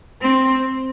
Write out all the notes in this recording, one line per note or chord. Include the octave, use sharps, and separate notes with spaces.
C4